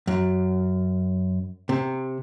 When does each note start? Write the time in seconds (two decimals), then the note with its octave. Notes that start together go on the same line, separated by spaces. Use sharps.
0.07 F#2
1.69 C3